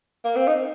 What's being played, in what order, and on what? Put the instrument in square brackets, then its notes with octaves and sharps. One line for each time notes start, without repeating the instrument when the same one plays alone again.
[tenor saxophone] A#3
C4
D#4